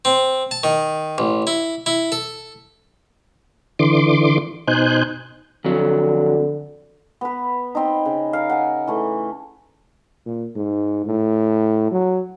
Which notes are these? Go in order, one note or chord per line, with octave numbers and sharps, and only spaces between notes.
C4
A5
D#3
A1
E4
E4
A4
D3 E3 C6 D6
B2 D#4 C5 G#5 F#6 G6
F2 D3 F#3
B3 B4
C4 D#4
C#3
A#4 F5
F#5 G#5
E3 A3
A#2
G#2
A2
F#3